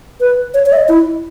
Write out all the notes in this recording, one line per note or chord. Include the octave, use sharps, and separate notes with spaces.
B4
C#5
C#5
E5
D#5
E4